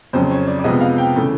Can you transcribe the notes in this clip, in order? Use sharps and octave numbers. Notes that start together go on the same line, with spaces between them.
F2 C#3 F#3 C5
C#5
D5
D5
C3 F3 G#3 B3 D#5
F5
G5
C#3 E3 A3